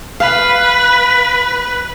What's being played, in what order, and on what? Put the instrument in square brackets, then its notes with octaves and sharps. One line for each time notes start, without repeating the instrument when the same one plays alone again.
[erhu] B4 [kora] F5